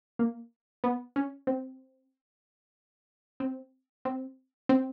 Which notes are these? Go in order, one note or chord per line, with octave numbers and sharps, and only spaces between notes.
A#3
B3
C#4
C4
C4
C4
C4